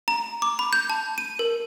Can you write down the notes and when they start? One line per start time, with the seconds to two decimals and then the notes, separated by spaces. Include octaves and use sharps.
0.08 A#5
0.42 D6
0.59 B5
0.73 G6
0.90 A5
1.18 D#7
1.39 A#4